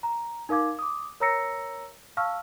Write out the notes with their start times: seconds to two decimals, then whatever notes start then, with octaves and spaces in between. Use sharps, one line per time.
0.03 A#5
0.49 D#4 A#4 F5 D6 G#6
0.79 D6 D#6
1.20 A#4 C#5 A#5 E6 A#6 C#7
2.17 F5 A5 C#6 E6 F6